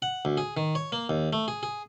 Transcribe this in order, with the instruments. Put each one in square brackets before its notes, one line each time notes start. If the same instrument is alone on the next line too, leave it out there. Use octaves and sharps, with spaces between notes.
[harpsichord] F#5
D2
G#4
D#3
C#5
A#3
D#2
A3
G#4
G#4